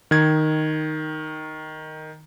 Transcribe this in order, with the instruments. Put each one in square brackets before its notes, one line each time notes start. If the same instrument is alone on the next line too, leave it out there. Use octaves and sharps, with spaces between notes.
[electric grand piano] D#3 G#6